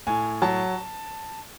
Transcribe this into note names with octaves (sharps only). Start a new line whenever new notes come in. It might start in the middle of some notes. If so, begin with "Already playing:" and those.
A2 G#5
F#3 A5